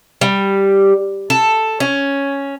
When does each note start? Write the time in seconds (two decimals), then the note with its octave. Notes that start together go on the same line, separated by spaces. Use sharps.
0.21 G3
1.30 A4
1.80 C#4